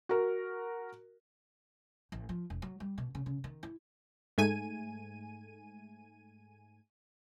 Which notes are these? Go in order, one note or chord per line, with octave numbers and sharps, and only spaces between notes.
F#4 A#4
A1
F3
E1
F#3
G3
B2
C#3
C#3
D#3
E4
G#2 A3 G#5 D#7